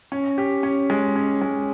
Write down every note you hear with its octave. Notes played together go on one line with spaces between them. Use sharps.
C#4
G4
C#4
G#3
C#4
G#3